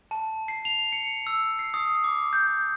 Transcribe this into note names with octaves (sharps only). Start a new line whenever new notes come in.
A5
C7
F7
C#7
E6
C7
D#6
D6
G6